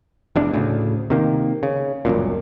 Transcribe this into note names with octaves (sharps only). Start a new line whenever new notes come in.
F1 E2 D4
D2 A2 C#3
C3 D#3 A#3
C#3
G1 C#2 F#2 A#2